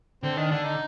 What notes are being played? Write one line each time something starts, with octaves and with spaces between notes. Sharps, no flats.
D3 C4
D#3 D4
D3 D4
D#4